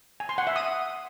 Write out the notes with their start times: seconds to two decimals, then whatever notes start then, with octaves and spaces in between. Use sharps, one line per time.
0.20 G#5
0.29 C6
0.38 F#5
0.47 E5
0.56 D#6